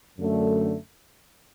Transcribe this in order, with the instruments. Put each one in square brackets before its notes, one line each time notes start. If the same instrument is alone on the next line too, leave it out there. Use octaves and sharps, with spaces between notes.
[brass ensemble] F#2 D3 A3